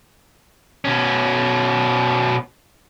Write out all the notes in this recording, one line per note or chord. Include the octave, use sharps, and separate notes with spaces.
B2 C#4